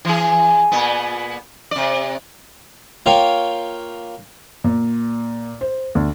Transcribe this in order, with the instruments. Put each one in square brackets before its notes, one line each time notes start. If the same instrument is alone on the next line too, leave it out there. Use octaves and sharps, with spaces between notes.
[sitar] E3 G#4
A#2 B3
C3 D5
[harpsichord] A#3 F4 C#5 F5 G5
[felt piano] A#2
C5
D2